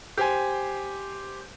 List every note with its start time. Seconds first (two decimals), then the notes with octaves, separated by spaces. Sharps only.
0.18 G4 C5 G#5